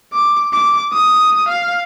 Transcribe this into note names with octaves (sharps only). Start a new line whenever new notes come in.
D6
D6
D#6
F5